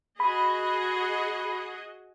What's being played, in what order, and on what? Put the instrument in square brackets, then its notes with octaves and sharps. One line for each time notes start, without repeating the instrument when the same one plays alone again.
[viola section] F#4 G#4 D#5 [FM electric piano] B5